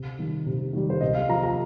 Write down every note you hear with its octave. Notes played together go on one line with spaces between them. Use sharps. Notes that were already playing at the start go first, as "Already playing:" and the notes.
Already playing: C3
D#3 G3
C3
D#3 G3
C5
C3 D#5
F5
F3 A#5
A#5